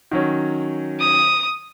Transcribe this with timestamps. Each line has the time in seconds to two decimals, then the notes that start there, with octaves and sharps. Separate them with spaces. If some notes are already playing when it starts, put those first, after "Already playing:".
0.11 D#3 F#3 C#4
1.00 D#6